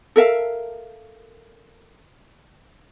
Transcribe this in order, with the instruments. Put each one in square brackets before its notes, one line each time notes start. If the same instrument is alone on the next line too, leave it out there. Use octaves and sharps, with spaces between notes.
[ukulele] A4 A#4 E5 F5